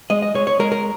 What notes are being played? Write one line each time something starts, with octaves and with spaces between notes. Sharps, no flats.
G#3 D#5
D#5
G#3 C#5
C#5
G#3 A#4
A#4